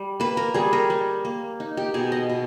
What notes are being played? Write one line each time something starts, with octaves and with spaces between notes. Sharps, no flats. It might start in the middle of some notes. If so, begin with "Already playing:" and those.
Already playing: G3
A#3 B4
A#4
G3 G#4
A#4
G3
A#3
D#4
G4
B2 G#4
D#5
B2